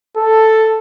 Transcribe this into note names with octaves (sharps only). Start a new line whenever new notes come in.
A4